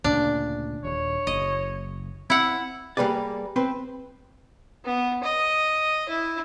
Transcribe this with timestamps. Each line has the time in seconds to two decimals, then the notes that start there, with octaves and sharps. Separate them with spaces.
0.04 D2 A#2 C#3 D4
0.85 D#1 C#5
1.27 F#1 D#5
2.30 C4 E4 E5 F#5
2.97 G3 A#3 G#4 B4 D5
3.56 C4 B4 C5
4.85 B3
5.23 D#5
6.09 E4